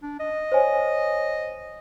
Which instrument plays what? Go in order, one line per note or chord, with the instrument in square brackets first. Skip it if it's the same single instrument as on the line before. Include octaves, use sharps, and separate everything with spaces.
[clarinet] D4
D#5
[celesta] C5 C#5 G#5